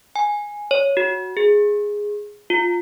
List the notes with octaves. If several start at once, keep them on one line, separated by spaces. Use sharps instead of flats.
G#5
C#5
F#4
G#4
F4